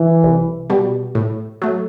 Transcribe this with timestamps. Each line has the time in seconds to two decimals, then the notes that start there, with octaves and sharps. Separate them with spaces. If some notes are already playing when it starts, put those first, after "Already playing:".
Already playing: E3
0.23 C2
0.70 B2 G3
1.15 A2
1.62 F#3 A3